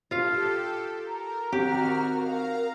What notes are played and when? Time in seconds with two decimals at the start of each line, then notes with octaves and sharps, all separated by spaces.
0.11 F4 G4 A4 F5
1.07 A#4 A#5
1.53 D#3 C4 F#4 G4 F6
2.15 A#4 F5 A#5